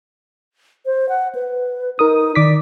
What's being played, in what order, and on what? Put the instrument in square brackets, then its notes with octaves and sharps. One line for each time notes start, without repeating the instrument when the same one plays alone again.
[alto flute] C5
F#5
B4
[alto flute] D#4 [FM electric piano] A#4 D#6
[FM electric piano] D#3 D6 B6 [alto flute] D5